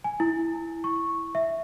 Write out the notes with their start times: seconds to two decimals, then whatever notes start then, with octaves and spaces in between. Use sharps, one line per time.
0.04 G#5
0.20 E4
0.84 C#6
1.35 E5